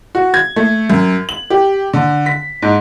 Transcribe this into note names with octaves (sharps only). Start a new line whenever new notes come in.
F#4
G#6
A3
F#2
F#7
G4
D3
B6
G#2